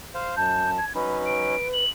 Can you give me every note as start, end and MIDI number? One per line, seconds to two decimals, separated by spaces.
0.15 0.35 72
0.15 0.35 77
0.36 0.79 42
0.36 0.84 81
0.36 0.70 91
0.78 0.93 92
0.95 1.56 54
0.95 1.56 61
0.95 1.56 63
0.95 1.84 71
0.95 1.15 83
1.26 1.68 98
1.73 1.90 102